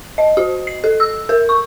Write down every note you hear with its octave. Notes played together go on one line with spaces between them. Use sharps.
D#5
F#4
C7
A4
E6
A#4
C#6